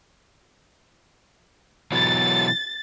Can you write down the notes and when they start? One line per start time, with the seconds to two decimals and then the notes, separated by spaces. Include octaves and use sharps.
1.92 B2 E3 F#3 A6